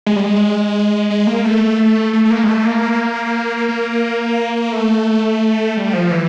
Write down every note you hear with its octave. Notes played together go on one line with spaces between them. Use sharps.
G#3
G3
G#3
G#3
A#3
A3
A3
A3
A#3
G#3
A3
A#3
A#3
A3
G3
F3
E3